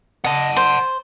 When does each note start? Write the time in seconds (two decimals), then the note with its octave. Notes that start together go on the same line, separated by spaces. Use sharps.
0.24 D#5 F#5 A5
0.57 C5